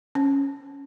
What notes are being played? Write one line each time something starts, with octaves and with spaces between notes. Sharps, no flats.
C#4